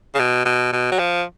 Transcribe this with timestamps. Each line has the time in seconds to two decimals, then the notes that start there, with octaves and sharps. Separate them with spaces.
0.15 C#3
0.19 B2
0.45 B2
0.73 B2
0.92 F#3
0.99 F3